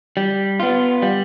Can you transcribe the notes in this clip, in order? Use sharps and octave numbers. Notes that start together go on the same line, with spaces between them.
G3
B3 F4
G3